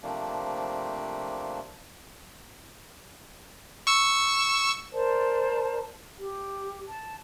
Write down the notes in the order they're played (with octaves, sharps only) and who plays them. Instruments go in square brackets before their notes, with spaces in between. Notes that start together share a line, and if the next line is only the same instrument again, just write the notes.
[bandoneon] C3 F3 A3 A#3 D4
[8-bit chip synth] C#6 E6
[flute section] A#4 C5 D5 A5
G4
A5